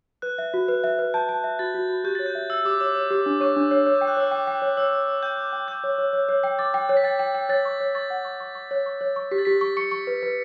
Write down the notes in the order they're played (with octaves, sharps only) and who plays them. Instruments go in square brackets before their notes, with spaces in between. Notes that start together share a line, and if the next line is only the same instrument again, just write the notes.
[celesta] B4 [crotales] F#6
[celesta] E5
F#4
B4
E5
B4
[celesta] A5 [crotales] G6
[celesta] A5
E5
[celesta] F#4 [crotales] A6
[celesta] F#4
F#4
[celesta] G4 [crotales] G6
[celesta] C#5 [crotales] A6
[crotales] G6
[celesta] E5
[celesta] E5 [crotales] E6
[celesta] G4 [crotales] D6
[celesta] C#5 [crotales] D6
[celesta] C#5
G4
D4
[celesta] C#5 [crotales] C#6
[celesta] D4
C#5
C#5
[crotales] G6
[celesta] G5
[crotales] F#6
[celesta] C#5 [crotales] E6
[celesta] G5 [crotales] D6
[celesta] G5
C#5
[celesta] C#5 [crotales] E6
[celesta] C#5
C#5
[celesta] G5 [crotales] G6
[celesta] D6
G5
[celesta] D6 [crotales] G6
[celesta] C#5
C#5
C#5
C#5
G5
[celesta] D6 [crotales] A6
[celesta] G5
C#5
[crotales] B6
[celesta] G5 [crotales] A6
[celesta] G5
G5
[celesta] C#5 [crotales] A6
[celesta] C#6
C#5
[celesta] C#6 [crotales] A6
[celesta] F#5
C#6
C#6
C#6
C#5
C#6
C#5
C#6
[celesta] G4 [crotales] B6
[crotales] A6
[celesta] G4 [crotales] B6
[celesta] C#6
[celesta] C#6 [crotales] C#7
[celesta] C#6
B4
B4